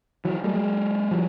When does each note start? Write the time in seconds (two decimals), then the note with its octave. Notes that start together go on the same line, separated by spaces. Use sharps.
0.25 E3 F#3
0.44 G3 A3
0.54 F#3 G#3
1.11 F3 G3